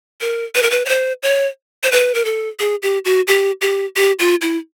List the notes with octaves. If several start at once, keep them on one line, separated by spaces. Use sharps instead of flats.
A#4
B4
A#4
B4
C#5
C5
C#5
C5
B4
A#4
A4
G#4
G4
F#4
G4
G4
G4
F4
E4